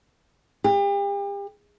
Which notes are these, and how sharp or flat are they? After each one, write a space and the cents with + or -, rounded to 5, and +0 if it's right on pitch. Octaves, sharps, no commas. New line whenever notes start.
G4 +40